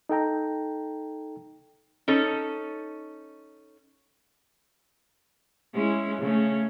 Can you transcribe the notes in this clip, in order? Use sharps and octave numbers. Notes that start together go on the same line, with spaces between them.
D#4 A4 G5 A#5
C#4 D#4 A4
G#3 C#4 E4
C#3 A3 C#4